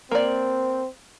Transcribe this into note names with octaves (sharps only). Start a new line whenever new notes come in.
A#3 C4 D5